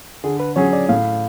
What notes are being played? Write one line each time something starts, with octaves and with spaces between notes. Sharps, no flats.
D3 G#4
B4
F#3 C#4 G#4 C#5
D5
A2 F5